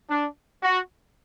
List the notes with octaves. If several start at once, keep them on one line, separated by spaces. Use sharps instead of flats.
D4
F#4